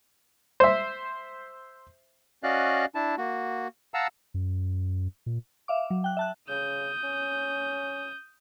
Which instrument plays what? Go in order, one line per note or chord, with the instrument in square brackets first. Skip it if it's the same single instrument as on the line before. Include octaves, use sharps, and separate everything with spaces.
[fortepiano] C5 E5
[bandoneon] C#4 F#4 D5 D#5 F5 F#6
D4 E4 A5
A#3 F#4
F5 F#5 A5 A#5 E6
[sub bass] F#2
A#2
[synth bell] E5 F5 D6
F#3
G5 F#6
E5 A5 F#6
[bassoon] C#3 [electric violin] D#6 G6
[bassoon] C#4